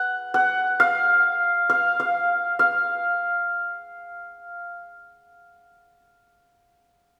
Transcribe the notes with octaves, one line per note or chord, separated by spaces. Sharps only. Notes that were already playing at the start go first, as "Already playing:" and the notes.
Already playing: F#5
F#5
F5
F5
F5
F5